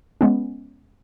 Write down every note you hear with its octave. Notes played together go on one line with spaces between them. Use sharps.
G#3 B3 C#4